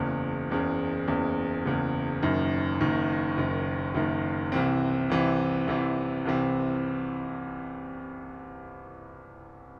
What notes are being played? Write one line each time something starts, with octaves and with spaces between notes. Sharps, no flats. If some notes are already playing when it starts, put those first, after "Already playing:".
Already playing: F#1 E2 C#3
F#1 E2 C#3
F#1 E2 C#3
F#1 E2 C#3
F#1 F#2 D#3
F#1 F#2 D#3
F#1 F#2 D#3
F#1 F#2 D#3
C2 C3 E3 C4
C2 C3 E3 C4
C2 C3 E3 C4
C2 C3 E3 C4